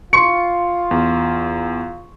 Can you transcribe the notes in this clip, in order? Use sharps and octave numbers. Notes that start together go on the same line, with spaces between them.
F4 C6 C#6 C#7
E2